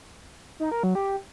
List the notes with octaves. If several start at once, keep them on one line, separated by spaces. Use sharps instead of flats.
D#4
A#4
F#3
G4